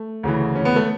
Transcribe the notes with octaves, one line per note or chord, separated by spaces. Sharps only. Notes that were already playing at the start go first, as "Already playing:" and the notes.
Already playing: A3
D2 C#3 E3
C#4
B3
A3